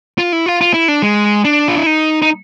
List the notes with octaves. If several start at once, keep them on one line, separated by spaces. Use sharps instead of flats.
F4
E4
F4
F4
E4
D4
G#3
D4
F4
E4
D#4
D#4